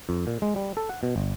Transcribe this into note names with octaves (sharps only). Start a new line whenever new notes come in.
F2
A#2
G#3
G3
A4
F#5
B2
G1